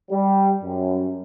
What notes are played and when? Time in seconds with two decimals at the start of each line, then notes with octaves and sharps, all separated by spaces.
0.11 G3
0.62 F#2